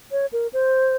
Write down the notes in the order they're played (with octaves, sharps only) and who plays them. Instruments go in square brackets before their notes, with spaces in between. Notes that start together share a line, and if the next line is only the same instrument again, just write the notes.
[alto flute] C#5
A#4
C5